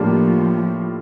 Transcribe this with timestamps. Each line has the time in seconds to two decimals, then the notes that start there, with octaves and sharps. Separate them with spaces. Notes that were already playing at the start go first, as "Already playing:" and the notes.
Already playing: A2 F3 G3 A#3 D4 F4